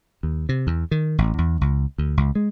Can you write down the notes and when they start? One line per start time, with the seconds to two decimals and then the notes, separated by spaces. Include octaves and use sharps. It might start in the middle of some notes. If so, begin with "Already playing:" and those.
0.23 D#2
0.49 C3
0.67 E2
0.91 D#3
1.18 A1
1.38 E2
1.61 C#2
1.98 D2
2.17 C#2
2.35 G#3